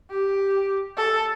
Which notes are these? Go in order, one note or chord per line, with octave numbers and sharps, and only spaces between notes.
G4
A4